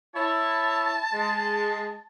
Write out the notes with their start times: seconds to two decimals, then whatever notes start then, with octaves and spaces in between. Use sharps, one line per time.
0.15 E4 C#5 A5
1.13 G#3